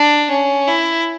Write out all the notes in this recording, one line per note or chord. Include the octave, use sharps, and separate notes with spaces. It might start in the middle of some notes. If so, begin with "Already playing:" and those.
Already playing: D4
C#4
E4